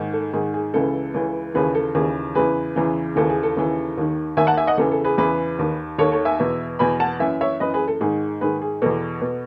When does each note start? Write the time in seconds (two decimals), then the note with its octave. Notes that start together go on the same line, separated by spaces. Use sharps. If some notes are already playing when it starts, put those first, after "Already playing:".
Already playing: G#2 D#3
0.13 A4
0.33 G#2 D#3 G#4
0.54 G#4
0.74 C#2 C#3 E3 A4
1.14 C#2 C#3 E3
1.54 D#2 C#3 E3 G#4 B4
1.75 A4
1.95 D#2 C#3 E3 G#4
2.35 E2 C#3 E3 G#4 B4
2.76 E2 C#3 E3
3.16 D#2 C#3 E3 A4
3.30 G#4
3.43 A4
3.57 D#2 C#3 E3
3.98 D#2 D#3
4.37 D#2 D#3 E5 G#5
4.47 F#5 A5
4.57 E5 G#5
4.67 D#5 F#5
4.78 E2 C#3 E3 A4
4.91 A4
5.04 G#4 B4
5.18 E2 C#3 E3 G#4 B4
5.59 D#2 D#3
5.98 D#2 D#3 A4 C#5
6.12 A4 C#5
6.25 E5 G#5
6.40 E2 B2
6.79 E2 B2 G#5 B5
7.00 F#5 A5
7.20 F#2 E3 E5 G#5
7.41 C#5 E5
7.60 F#2 E3 B4 D#5
7.74 G#4 B4
7.88 A4
8.01 G#2 D#3 G#4
8.41 G#2 D#3 G#4 B4
8.62 G#4
8.82 E2 B2 A4
9.21 B2